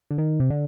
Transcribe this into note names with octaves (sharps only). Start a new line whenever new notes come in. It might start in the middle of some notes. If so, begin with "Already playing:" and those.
D3
D#3
C3
D3